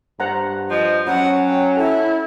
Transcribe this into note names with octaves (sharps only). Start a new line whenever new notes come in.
G2 C5 F#5 A#5
F3 D#5
F#3 C#4 F#4 F#5
G5
E4 A4